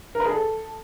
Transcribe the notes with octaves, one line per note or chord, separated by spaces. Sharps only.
A#4
B4
G#4
A4